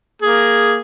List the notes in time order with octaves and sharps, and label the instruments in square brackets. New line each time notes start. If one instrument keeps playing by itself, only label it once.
[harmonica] A#3 G#4